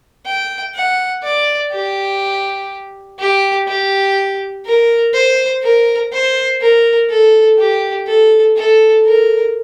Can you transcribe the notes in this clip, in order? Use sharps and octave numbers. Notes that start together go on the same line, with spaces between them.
G5
F#5
D5
G4
G4
G4
A#4
C5
A#4
C5
A#4
A4
G4
A4
A4
A#4